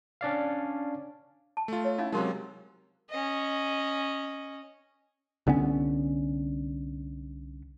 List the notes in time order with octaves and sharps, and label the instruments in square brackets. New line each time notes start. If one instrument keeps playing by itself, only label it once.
[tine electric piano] C#4 D4 D5 F5
[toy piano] A5
[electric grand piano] A3 F4
[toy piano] C#5
[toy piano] C#4 D#4 F5 [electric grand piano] E4
[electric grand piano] C3 F#3 G#3 [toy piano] D#4 A#4 C6
[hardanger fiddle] C#4 D#5
[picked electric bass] C2 D3 B3 C#4